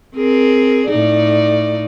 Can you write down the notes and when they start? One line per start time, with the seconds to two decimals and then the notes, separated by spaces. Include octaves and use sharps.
0.16 C4 G#4 A#4
0.88 A2 D#4 D5